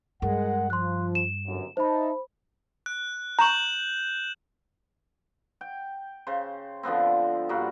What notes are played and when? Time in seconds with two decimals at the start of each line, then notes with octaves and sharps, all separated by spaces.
0.22 G2 G#3 A#4 F#5
0.70 F3 C6 F#6
1.15 E7
1.46 G1 F#2
1.77 D#4 C5 E5 A5 B5
2.86 F#6
3.39 A#5 C#6 G6 E7 F#7
5.61 G5
6.27 C#3 C5
6.83 D3 F3 B3 C4
7.49 G2 G3 A#3 F#4